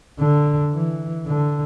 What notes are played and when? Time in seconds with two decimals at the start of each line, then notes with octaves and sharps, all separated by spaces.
0.19 D3
0.73 E3
1.27 D3